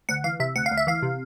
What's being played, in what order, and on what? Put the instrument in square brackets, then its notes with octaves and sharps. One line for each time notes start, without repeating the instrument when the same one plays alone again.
[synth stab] D2 F#5
E3 F5
C3 E5
D2 F#5
F5
D2
E5
E3 F5
C3